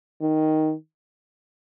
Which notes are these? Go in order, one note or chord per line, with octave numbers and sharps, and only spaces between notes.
D#3